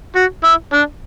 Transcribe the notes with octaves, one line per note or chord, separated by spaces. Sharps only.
F#4
E4
D4